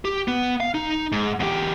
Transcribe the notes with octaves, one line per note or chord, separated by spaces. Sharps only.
G4
B3
F5
D#4
G#2
E2 G4